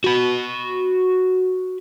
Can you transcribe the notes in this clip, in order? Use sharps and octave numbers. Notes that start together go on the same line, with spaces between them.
F#4 B5